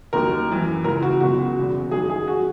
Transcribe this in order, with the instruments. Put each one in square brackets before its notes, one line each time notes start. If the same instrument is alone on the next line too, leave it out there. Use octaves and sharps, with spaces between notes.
[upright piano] D#2 D#3 F#3 A#4
F#2 E3
C#2 C#3 E3 A#4
F#4
C#2 B2 F#3 F#4
E2 C#3 F#3
F#2 D#3 F#3 G#4
G#4
F#3 F#4